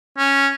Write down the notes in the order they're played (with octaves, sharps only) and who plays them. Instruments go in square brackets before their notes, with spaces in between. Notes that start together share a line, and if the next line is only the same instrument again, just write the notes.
[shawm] C#4